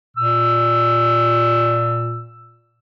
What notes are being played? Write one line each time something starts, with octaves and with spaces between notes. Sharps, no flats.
A#2 E6